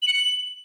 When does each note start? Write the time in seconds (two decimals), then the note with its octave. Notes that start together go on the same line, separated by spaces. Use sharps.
0.02 F#7
0.08 C#7
0.13 F#7